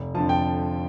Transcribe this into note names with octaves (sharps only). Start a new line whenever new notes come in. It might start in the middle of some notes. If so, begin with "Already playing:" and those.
Already playing: F1
F2 D3 F3 A5
G5